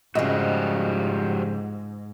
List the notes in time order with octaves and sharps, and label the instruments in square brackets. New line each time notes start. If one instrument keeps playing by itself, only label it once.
[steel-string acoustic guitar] F2 C#3 [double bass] G#2 [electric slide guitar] F3 G3 F#4 [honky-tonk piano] D#5